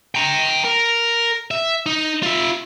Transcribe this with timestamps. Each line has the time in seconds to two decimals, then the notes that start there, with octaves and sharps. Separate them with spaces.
0.15 G5 A#5
0.65 A#4
1.51 E5
1.86 D#4
2.23 F4 E5